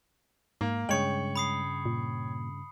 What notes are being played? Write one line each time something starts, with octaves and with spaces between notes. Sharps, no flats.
G#2 A#3
G2 C#3 G#3 C#5 G5 C#7 F#7
B5 D#6 C7
A#2